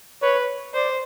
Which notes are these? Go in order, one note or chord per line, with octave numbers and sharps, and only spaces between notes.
B4 C#5
C5 D5